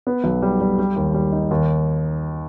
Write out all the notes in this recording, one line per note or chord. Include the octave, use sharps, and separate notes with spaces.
B3
B1
G3
G3
G3
D#2
G3
D#4
D#2